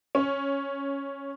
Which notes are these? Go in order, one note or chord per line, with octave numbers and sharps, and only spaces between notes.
C#4